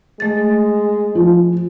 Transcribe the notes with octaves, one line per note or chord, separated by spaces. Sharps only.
G#3 A3 A6
F3